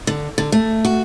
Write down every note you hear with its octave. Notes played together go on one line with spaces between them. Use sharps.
D3
D3
A3
F#4